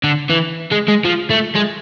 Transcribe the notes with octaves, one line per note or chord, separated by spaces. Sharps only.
D3
E3
G#3
G#3
F3
A3
G#3